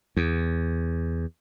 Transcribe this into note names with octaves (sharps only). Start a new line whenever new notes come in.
E2